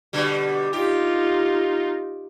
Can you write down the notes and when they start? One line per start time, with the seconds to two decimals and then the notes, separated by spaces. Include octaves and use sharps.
0.13 B2 D3 G3
0.73 D#4 F4 G4